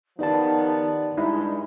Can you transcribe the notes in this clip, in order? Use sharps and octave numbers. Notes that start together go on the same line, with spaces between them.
D#3 F3 B3 D#4 G4 D5 A5
G2 G#3 D#4 E4